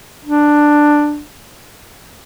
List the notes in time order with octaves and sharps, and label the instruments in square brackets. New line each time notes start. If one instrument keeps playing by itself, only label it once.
[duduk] D4